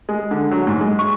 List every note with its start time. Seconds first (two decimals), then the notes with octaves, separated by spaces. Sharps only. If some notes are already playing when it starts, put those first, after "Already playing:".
0.09 G#3
0.31 D3
0.51 F#3
0.67 G#2
0.81 G#3
0.99 C#6